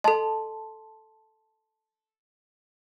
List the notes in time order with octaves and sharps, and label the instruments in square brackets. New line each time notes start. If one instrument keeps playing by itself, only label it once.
[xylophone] A4 D#5 [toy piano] A5 C6